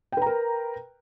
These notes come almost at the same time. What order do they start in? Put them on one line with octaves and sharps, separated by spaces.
G5 B4 A#5 A#4